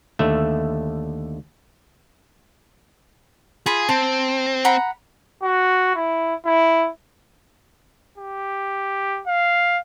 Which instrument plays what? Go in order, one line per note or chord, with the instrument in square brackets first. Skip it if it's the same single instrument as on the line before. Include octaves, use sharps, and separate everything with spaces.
[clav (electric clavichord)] D#2 D3 A3 E5
[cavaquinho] F4 B5 [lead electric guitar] G#4
[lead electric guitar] C4 [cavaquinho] A5 C6
[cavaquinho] F#5 A#5 B5
[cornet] F#4
E4
E4
G4
F5